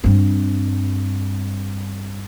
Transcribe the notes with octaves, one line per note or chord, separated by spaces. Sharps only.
G2 C4